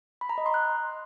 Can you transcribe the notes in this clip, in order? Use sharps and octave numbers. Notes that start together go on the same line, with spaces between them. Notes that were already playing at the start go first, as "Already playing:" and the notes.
B5
A#5
D#5
C6
F#6